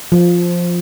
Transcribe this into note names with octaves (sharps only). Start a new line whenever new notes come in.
F3